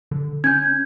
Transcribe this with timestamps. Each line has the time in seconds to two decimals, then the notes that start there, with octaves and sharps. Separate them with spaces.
0.11 D3
0.44 C#4 G6 G#6